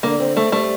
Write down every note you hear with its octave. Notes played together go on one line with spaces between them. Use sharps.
D3 A#3
C4
A3 C4
G3 A3